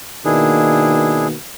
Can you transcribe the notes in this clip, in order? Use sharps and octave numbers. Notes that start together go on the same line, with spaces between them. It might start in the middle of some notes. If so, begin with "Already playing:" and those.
B2 D#3 A#3 D4 E4 G#4